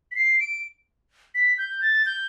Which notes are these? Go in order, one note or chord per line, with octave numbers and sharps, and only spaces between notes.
B6
C7
D7
B6
G6
A6
G6